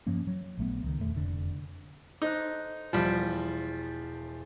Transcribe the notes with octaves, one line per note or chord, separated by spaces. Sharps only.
G2 F3 A#3 C#4
F#3
A#1 A3 B3
C#2 D#3
D#1 E2 A3
F1 F2 D3
D#4 A4 C5 F#6
E1 E2 F3 G3 G6